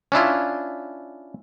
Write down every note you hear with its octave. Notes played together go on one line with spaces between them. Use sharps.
C#4 D4 E4 F4